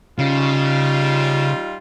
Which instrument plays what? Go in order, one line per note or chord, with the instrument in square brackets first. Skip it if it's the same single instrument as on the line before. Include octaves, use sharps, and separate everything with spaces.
[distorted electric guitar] C#3 [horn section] G3 D#4 F4